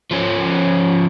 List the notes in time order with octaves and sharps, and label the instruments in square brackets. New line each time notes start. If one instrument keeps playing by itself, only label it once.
[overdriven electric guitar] F3 C#4